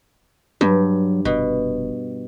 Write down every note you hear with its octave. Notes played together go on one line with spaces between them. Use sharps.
G2 F#3
F1 B2